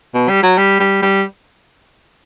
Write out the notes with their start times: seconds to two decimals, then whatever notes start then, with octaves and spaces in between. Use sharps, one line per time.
0.14 B2
0.29 G3
0.43 F#3
0.58 G3
0.79 G3
1.02 G3